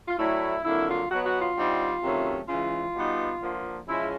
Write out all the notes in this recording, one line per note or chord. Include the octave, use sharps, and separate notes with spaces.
F4
A2 F#3 A3 D4 E4
F2 D3 F#3 A#3 E4
F4
B2 F#3 B3 F#4
F#4
F4
D3 G3 C4 D#4
C3 D#3 F#3 A3 C#4
C#3 E3 G#3 F4
B2 G3 B3 D#4
D3 F3 A#3
C#3 F3 G#3 C#4 E4